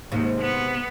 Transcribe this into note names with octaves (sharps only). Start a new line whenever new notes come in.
D#2 G#2 C3
B3